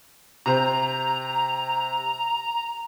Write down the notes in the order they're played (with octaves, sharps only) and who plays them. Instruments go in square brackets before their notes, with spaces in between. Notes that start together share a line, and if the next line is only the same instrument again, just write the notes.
[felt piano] C3 C5 [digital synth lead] A#5